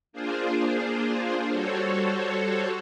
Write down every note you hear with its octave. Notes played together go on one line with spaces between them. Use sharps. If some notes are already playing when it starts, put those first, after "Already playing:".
A#3 D4 F4 G#4 C5
G3 F#4 A4 C5 C#5